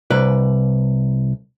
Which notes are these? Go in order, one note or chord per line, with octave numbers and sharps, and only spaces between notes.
C2 B4 D5